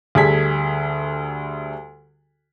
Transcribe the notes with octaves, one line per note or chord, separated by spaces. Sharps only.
D2 G3 G#4 A4 G#6 B6